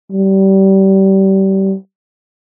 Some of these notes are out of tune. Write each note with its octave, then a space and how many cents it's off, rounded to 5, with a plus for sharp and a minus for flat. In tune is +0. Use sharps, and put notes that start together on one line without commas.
G3 -25